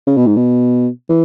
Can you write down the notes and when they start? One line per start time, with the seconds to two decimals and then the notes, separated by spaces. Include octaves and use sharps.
0.07 C#3
0.17 B2
0.27 G#2
0.37 B2
1.09 E3